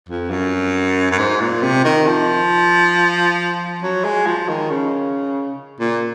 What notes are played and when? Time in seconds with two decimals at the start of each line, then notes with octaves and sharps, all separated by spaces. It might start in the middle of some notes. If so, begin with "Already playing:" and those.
0.09 F2
0.31 F#2
1.11 F#2
1.18 G#2
1.41 A#2
1.62 C3
1.85 D#3
2.07 F3
3.83 F#3
4.04 G#3
4.27 F3
4.49 D#3
4.70 C#3
5.80 A#2